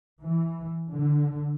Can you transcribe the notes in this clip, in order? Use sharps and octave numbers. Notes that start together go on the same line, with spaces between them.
E3
D3